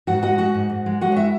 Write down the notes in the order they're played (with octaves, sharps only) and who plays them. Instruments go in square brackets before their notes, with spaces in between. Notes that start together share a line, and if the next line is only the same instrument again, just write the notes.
[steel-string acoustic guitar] G#2 F#4 F#5
G#3 F#4 F#5
G#3 F#4 F#5
G#2
G#2
G#3
G#3 F#4 F#5
C#5
E4 E5